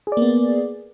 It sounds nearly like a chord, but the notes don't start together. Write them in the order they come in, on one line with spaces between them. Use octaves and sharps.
G#4 D5 A#3 B3